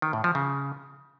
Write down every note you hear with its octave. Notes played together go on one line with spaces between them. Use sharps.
D#3
A2
F3
C#3